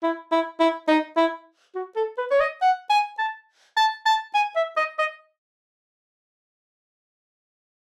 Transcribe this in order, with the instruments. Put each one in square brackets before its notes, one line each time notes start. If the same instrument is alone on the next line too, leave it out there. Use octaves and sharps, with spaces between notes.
[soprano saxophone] E4
E4
E4
D#4
E4
F#4
A4
B4
C#5
D#5
F#5
G#5
A5
A5
A5
G#5
E5
D#5
D#5